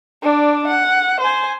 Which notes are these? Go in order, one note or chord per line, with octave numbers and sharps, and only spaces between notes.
D4 D5
F#5
C5 G#5